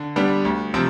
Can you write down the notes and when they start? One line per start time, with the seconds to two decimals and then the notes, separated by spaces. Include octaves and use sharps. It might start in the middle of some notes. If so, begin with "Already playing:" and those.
Already playing: D3
0.16 G3 B3 D4
0.45 D2
0.74 C3 F3 C4